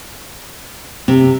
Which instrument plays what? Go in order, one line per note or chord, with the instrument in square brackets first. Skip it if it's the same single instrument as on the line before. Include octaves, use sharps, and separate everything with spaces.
[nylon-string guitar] C3 [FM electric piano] C4